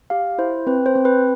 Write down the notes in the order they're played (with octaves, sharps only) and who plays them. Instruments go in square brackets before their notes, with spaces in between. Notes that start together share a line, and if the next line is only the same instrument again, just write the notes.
[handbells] G4 F5
E4 C5
C4 B4
C5
C4
B4